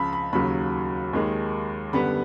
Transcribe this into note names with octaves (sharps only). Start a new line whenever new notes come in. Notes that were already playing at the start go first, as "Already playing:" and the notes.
Already playing: C#2 C#3 F3 A5 B5
B5
D#2 C#3 F#3 B5
D#2 D#3 G#3
F#2 D3 G3 B3 B5